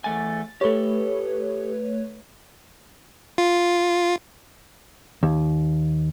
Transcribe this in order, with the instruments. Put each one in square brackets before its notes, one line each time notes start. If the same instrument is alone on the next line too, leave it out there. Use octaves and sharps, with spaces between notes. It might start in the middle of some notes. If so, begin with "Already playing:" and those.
[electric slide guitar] E2 A3 G#5 [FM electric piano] A6
[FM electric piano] A3 B4 C#5 [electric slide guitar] G4 A4
[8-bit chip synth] F4
[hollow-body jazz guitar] D#2